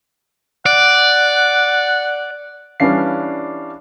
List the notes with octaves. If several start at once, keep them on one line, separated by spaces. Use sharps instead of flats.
D5 F#5
E3 G3 C#4 D4 F5 C7